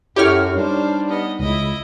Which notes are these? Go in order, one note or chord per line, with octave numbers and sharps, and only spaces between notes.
F#2 E4 F#4 G4 A4 C#5 F6
G3 D4 D#4 C5
B3 D#5
C#2 E4 D#5